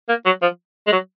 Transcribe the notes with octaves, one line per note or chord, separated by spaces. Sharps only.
A#3
F#3
F3
G#3
F#3